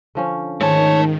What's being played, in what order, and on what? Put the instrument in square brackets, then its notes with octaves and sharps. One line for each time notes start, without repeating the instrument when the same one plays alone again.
[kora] D3 F3 C#4
[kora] G#2 [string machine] D#3 [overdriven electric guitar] A3 A5 [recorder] C#5